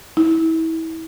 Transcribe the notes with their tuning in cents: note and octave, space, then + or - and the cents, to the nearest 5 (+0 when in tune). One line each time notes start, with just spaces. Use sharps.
E4 -30